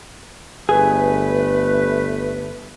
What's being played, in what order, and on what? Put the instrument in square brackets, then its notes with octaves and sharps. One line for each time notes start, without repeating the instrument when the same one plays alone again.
[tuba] G1 [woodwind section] A3 B4 [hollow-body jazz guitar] G#4